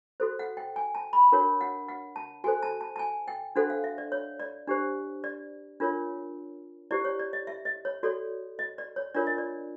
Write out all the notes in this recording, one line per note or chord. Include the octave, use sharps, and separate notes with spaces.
F#4 A4 C5
F#5
G5
G#5
A5
B5
D4 F#4 A#4 C#5
F#5
F#5
A5
F#4 A4 C5 G#5
A5
A5
A5
G#5
G5
D4 F#4 A4 C5 F#5
F5
E5
D5
C#5
D5
D4 G4 C5
D5
D4 F4 A#4 C#5
E4 G4 C5 D5
C#5
D5
D#5
E5
D#5
C#5
F#4 A4 C#5 D5
D#5
D5
C#5
D4 F4 A#4 C#5 D5
D#5
D5